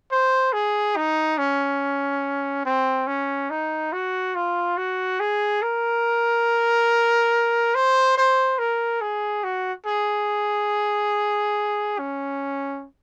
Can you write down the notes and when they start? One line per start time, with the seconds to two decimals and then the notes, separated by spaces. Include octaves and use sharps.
0.11 C5
0.53 G#4
0.96 D#4
1.38 C#4
2.66 C4
3.07 C#4
3.50 D#4
3.92 F#4
4.35 F4
4.77 F#4
5.20 G#4
5.62 A#4
7.75 C5
8.17 C5
8.59 A#4
9.01 G#4
9.44 F#4
9.86 G#4
11.99 C#4